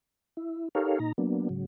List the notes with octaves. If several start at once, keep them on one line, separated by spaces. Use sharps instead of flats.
E4
D#4 G4 A4 A#4 C#5 F5
A#2 D#4 A#5
F#3 A#3 B3 D4
G#2 C#3 F#3